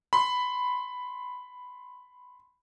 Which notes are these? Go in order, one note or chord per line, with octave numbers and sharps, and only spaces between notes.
B5 C6